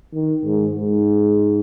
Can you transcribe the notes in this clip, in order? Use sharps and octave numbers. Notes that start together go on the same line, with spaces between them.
D#3
G#2
G#2